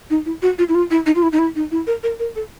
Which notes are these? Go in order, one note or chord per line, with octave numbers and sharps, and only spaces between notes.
D#4
E4
F#4
F4
E4
F4
E4
D#4
F4
E4
D#4
E4
D#4
E4
A#4
A#4
A#4
A4